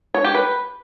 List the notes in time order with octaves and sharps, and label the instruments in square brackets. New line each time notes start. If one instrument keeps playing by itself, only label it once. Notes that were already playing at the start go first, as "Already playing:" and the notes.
[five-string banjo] C#5
G4
B4